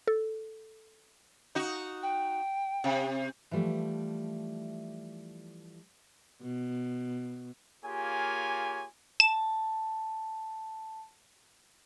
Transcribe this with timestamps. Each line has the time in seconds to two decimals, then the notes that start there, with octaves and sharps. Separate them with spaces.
0.07 A4
1.55 D#4 F#4
2.03 G5
2.84 C3
3.51 E3 F3 G3 A3
6.42 B2
7.83 A#3 F4 G4 G#4 C#5 G#5
9.20 A5 E7